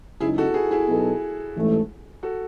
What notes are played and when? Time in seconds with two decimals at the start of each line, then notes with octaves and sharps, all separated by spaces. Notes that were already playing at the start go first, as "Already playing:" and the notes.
0.20 F#1 F#2 C#3 G#3 D#4 E4 G#4
0.38 F#4 A4
0.54 E4 G#4
0.71 E4 G#4
0.88 B2 F#3 B3 D#4 A4
1.56 A1 G#2 E3 A3
2.23 F#4 A4